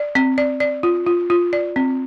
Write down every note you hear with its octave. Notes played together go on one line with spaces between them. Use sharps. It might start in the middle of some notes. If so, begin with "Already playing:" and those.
Already playing: D5
C4
D5
D5
F4
F4
F4
D5
C4